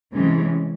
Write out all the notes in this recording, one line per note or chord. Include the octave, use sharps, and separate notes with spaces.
C3 E3 G#3 C#4